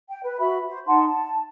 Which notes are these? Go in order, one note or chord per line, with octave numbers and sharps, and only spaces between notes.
G5
B4
F#4 E5 B5
C5
D#4 F#5 A5 C6
A5